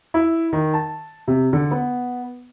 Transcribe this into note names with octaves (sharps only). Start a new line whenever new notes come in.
E4
D#3
A5
C3
D3
B3